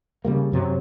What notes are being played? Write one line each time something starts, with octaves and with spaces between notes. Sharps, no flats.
C#3 G3 A#3
F#2 C3 F#3